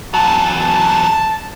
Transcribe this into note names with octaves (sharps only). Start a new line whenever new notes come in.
E2 F#3 A5
A5